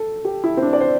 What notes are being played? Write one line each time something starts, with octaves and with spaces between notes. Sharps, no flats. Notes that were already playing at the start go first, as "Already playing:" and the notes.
Already playing: A4
G4
E4
C4
D4
D5
C5